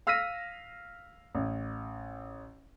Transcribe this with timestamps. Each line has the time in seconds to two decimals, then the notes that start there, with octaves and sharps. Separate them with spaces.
0.07 F5 E6 F6 A#6 B6 D#7
1.35 A1